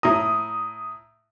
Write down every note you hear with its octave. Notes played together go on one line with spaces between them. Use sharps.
A2 A#5 D#6